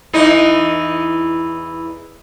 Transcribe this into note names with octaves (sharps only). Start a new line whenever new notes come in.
E2 E3 D#4